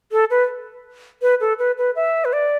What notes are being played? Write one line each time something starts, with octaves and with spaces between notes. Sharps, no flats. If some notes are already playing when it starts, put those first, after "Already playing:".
A4
B4
B4
A4
B4
B4
E5
B4
D5